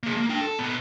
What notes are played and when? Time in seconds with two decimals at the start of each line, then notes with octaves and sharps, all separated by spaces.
0.03 A#3 G#4
0.17 A#3
0.29 D4 G5
0.41 A4
0.59 A#2 B3